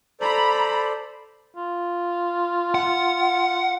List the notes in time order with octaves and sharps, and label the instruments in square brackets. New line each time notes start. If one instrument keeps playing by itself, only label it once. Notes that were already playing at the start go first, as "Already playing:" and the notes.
[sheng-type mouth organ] A4 C5 D5 [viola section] A#5 B5
[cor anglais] F4
[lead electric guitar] F#5